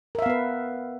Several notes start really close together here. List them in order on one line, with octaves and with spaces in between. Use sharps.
A#4 E5 F5 B3 B4